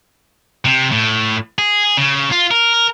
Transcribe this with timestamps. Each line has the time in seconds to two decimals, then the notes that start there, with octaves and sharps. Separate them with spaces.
0.65 C3
0.92 A2
1.58 G#4
1.97 C#3
2.31 F4
2.51 A#4